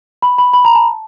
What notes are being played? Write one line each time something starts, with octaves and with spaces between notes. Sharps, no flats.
B5
B5
B5
A#5
A5